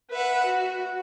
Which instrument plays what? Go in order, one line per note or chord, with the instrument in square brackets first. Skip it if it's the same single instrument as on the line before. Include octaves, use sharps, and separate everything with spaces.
[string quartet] B4 E5 F#5
F#4